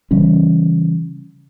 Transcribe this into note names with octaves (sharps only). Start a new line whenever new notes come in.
C#3 E3 G3 C#4